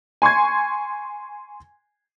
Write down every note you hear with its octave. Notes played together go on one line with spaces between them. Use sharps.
G#5 C6 C#6 G#6